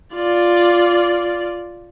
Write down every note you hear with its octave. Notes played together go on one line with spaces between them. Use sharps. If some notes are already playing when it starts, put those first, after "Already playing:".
F4 D5